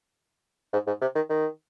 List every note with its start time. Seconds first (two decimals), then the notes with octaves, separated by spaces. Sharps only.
0.73 G#2
0.87 G#2
1.01 C3
1.16 D#3
1.30 D#3